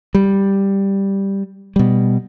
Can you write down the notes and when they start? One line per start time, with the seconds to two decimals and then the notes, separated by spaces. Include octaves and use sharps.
0.15 G3
1.76 B2 G3